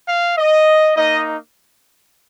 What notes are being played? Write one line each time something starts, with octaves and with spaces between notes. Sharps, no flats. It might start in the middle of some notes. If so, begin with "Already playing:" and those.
F5
D#5
A#3 D#4 D#5